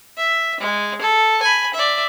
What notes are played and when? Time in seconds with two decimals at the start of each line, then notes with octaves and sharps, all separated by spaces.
0.17 E5
0.60 G#3
1.02 A4
1.42 G#5 B5
1.74 D5 E5